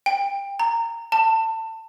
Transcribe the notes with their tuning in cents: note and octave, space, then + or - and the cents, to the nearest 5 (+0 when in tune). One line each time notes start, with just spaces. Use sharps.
G5 +25
A#5 -20
A5 +25